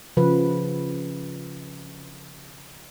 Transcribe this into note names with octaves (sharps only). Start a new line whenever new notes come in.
C#3 F3 B4